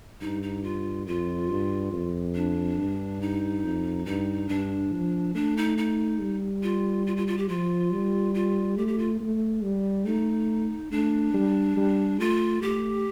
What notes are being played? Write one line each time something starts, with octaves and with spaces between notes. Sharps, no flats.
G2 D#4
D#4
F4
F2 F4
G2
F2
D4
G2
D#4
F2
G2 D#4
G2 D4
F3
A3 D4
D#4
D#4
G3
F4
F4
F4
F4
G4
F3 F4
G3
F4
A3 G4
G4
F4
A3
G3
A3 D#4
A3 D4
G3
G3
A3 F4
A3 G4